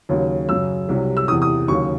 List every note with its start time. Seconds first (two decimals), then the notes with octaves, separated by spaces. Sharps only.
0.09 D#2 C#3 F#3
0.49 F#2 C#3 F#3 E6
0.89 C2 C3 F#3
1.17 E6
1.28 E2 C3 E3 D#6
1.42 D#6
1.68 D#2 C#3 F#3 C#6